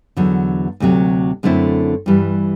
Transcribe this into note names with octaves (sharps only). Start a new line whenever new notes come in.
E2 D3 F#3
D2 C3 F#3
F#2 D3 A3 C4 E4
G2 E3 G3